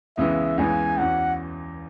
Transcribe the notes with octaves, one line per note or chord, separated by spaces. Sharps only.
C#2 C#3 E3 G#3 B3 E5
C#2 C#3 E3 G#3 B3 G#5
E2 E3 C#4 F#4 F#5